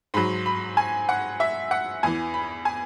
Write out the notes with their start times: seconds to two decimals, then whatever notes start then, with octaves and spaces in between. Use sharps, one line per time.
0.14 G#2 F#3 B5
0.46 B5
0.77 G#5
1.09 F#5
1.40 E5
1.71 F#5
2.03 E2 E3 G#5
2.34 B5
2.65 G#5